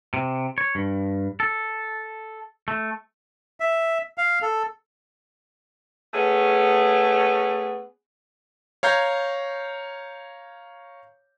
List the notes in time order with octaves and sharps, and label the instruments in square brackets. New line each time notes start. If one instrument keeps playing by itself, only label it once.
[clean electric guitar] C3
C#5
G2
A4
A3
[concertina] E5
F5
A4
[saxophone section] A3 B3 C#4 G#4
[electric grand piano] C#5 F5 A#5 G6 G#6